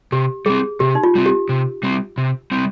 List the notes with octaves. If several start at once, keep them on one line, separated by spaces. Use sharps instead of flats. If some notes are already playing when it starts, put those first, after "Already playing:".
C3 G4
G3 C4 G#4
C3 G4
D#4
F4
G3 C4
G4
C3
G3 C4
C3
G3 C4